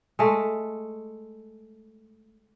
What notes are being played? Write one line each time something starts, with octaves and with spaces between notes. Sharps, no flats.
G#3 A3